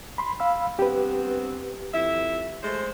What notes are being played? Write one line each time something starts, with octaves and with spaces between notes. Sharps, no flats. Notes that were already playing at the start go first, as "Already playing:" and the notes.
B5 C6
F5 B5 E6
G2 B3 C4 G4 B4
F2 E4 E5
G#3 A3 C5